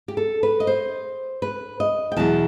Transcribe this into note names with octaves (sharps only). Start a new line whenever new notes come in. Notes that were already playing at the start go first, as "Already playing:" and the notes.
G4
A4
B4
D#5
C5
B4
D#5
G5
E2 B2 F#3 A5